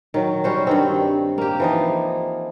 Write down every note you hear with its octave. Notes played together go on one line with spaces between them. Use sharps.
D#3 F#3
G3 C#4 F#4 C5
G2 D#3 C4
A#3 G4
E3 F3 D#4